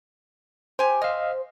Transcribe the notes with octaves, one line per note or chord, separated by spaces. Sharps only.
G4 C5 G#5
D#5 F5 F6